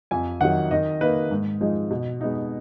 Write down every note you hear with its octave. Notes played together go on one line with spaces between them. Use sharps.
F2 G#5
D#3 F#3 F#5
D#3 D#5
A#3 D#4 B4
G#2
F3 G#3 D#4
B2
G#3 B3 D#4